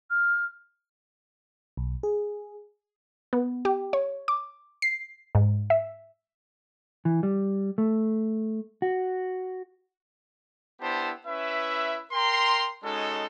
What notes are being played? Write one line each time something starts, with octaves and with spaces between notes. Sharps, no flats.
F6
B1
G#4
B3
G4
C#5
D6
C7
G#2
E5
E3
G3
A3
F#4
B3 D4 E4 G4 C5 A5
C#4 E4 B4 E5
A#4 G5 A#5 C6
G#3 C#4 D#4 F#4 A4